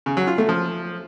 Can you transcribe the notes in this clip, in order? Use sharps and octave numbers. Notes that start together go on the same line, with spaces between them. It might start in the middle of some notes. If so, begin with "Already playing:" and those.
C#3
F#3
F4
A3
F3